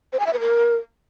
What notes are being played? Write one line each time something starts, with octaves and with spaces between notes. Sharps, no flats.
C5
G#5
E5
B4
A#4